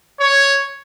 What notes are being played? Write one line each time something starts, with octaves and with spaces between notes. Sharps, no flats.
C#5